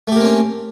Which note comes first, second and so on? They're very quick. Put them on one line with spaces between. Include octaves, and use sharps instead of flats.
A3 G4 A#3 C4 C#4